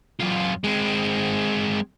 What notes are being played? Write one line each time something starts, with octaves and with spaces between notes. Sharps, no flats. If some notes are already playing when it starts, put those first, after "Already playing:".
F#2 F4
G#3 C4